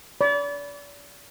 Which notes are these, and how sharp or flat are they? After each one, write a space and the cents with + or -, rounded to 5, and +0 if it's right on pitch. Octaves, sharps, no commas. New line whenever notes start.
D5 -35 B5 +0